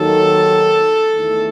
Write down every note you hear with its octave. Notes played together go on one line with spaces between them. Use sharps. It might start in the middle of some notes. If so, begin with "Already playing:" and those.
Already playing: D#2 D#3 F#3 A4
E2 D#3 A3 E4